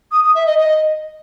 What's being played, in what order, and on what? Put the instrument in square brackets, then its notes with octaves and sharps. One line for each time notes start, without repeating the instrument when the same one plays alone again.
[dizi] D#6
D#6
E5
D#5
D#5